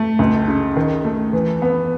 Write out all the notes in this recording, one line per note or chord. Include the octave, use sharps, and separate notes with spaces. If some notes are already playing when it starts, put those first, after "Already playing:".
Already playing: A3
C#2
C#3
D#3
A3
E3
B3